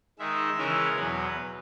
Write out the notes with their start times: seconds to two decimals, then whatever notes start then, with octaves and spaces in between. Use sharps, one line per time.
0.19 D#3 G#3 D#4 E5
0.58 C#3 E3 G#3 C#4 E4 A#4
0.96 E2 B2 F#3 B4